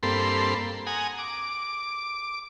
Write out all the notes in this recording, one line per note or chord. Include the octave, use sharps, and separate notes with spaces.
G2 A#3 C4 A4 B5 C6
F#5 G#5 A#5 D#6
D6